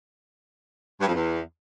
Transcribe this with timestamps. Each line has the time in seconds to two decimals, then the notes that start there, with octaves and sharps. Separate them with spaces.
1.00 G2
1.08 F2
1.15 E2